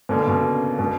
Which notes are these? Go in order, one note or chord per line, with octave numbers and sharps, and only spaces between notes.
B2 D3 A#3 C#4
B2
C#3
B2